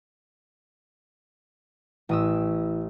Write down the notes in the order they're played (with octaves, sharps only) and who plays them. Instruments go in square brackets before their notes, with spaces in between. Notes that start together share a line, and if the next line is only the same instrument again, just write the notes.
[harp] A1 D#6 E6 [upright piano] E3